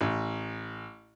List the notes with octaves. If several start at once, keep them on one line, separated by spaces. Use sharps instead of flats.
A1